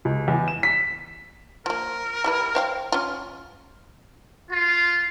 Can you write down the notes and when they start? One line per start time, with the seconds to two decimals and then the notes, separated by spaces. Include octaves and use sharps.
0.05 C#2
0.28 E2
0.48 E7
0.63 B6
1.66 F3 A#3 A#4
2.24 G3 E4 B4
2.55 C5 F5 G5
2.92 C#4 F4
4.50 F4